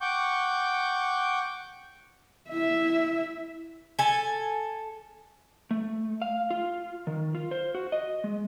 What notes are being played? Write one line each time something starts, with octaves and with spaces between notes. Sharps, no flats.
F#5 G5 C#6 D6 G6
E4 E5
A4 G#5
A3
F5
F4
D#3
F4
C5
F#4
D#5
G#3